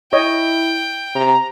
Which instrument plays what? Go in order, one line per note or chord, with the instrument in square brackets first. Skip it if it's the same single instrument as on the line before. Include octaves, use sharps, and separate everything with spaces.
[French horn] E4 [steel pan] C#5 D#5 [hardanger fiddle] G5
[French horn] C3 [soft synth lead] A#5